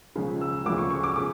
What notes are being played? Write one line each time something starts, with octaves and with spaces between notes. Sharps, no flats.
C#2 C#3 F3
E6
D2 C#3 F3 D6
C#6
C#6
D6
C#3 D6